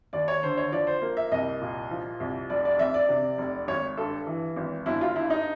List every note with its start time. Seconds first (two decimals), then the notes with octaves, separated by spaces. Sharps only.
0.13 D#2 D5
0.28 C#5
0.43 D3 C5
0.57 C#5
0.72 F3 D5
0.87 C5
1.02 A#3
1.17 E5
1.32 C2 D#5
1.61 A#2
1.91 F3
2.20 C2
2.50 F1 D5
2.65 D5
2.79 F2 E5
2.94 D5
3.09 C3
3.38 F1
3.68 G#1 C#5
3.97 G2 A4
4.27 E3
4.56 G#1
4.86 G1 E4
5.01 F4
5.16 G2 E4
5.30 D#4